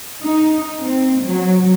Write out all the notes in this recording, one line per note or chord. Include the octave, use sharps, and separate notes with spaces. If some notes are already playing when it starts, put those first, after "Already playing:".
D#4
C4
F#3